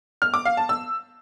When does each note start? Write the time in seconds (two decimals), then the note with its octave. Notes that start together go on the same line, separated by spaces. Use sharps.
0.22 F6
0.34 D6
0.45 F5
0.57 A5
0.69 E6